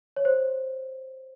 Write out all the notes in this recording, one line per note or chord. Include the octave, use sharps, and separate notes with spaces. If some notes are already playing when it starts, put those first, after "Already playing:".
C#5
C5